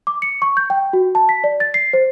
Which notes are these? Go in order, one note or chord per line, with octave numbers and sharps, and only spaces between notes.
D6
C#7
C#6
G6
G5
F#4
A5
B6
D5
A6
C7
C5